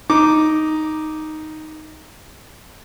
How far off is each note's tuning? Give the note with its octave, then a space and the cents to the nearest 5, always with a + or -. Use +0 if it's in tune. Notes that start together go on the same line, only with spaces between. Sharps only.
D#4 +0 D6 +0